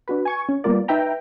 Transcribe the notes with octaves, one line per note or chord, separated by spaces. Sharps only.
D4 F#4 B4
G#5 C#6 G#6
C#4
G3 A#3 B3 F4 A#4 D5
D#4 B4 E5 G5 A#5